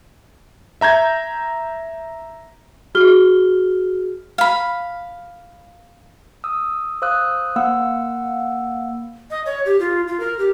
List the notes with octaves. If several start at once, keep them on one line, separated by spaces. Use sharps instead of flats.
E5 A#5 G6 G#6
F#4 G#4 F6 G7
F5 B5
D#6 E6
C5 F5 D#6 E6 F#6
A#3 F5 F#5 B5 E6
D#5
C#5
G4
F4
F4
A#4
G4